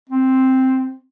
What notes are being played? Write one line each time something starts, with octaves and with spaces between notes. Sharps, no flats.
C4